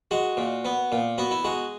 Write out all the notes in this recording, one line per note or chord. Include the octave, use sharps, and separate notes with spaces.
G#3 F#4
A#2
B3
A#2
B3 F#4
E4
G#3 F#4